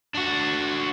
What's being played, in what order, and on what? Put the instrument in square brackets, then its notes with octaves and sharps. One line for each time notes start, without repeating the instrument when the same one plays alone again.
[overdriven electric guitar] D4 F#4